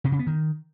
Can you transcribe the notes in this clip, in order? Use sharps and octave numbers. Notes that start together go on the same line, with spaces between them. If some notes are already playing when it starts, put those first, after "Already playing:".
C3
C#3
B3
D#3